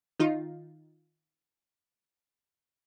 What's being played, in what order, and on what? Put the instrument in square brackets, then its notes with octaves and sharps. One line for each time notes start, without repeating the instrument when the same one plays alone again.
[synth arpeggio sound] D#3 D#4 F4